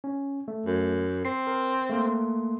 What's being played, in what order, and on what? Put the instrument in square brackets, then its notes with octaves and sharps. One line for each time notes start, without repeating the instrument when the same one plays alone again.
[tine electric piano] C#4
A3
[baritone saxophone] F#2
[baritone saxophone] C4 [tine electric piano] C7
[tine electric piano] A#4
A3 A#3 C6